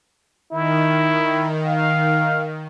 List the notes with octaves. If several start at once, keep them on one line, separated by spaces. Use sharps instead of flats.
D#3 E4
F5